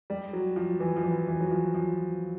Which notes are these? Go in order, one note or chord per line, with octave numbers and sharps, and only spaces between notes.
G3
F#3
F3
E3
F3
E3
E3
F#3
F3
F3